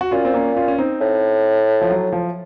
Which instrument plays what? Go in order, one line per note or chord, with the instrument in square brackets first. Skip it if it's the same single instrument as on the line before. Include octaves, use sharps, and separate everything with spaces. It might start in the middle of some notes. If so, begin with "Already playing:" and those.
[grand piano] F#4
[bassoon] A#2 [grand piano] C#4 F4
[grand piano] C4
A#3 C#4
C#4 F4
C#4
C4 D#4
[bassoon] A2
[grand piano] F3
F#3
F3